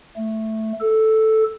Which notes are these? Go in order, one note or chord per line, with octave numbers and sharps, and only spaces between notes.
A3
A4